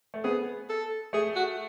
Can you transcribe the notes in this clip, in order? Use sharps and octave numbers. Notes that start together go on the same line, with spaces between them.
A3
B3 G#4
A4
A3 G#4
F#4